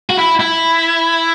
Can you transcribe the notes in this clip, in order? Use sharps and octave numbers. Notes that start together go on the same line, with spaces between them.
F#4
E4
E4